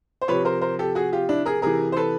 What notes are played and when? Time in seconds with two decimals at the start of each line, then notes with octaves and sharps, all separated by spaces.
0.22 C5
0.28 C3 F3 B4 C#5
0.45 A#4 C5
0.61 A#4 C5
0.79 G4 A4
0.95 F#4 G#4
1.12 F4 G4
1.29 D4 E4
1.46 G#4 A#4
1.62 C3 E3 G#4 A#4
1.92 C5
1.96 A4 B4